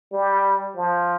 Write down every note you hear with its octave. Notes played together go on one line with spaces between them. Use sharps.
G3
F3